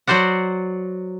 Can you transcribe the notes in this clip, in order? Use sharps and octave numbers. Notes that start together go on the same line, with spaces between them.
F#3 F#4 C5 D5 F#5